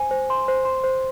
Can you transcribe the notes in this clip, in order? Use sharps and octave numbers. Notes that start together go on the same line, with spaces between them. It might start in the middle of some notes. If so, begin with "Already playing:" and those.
Already playing: C5 G#5
C5
C6
C5
C6
C5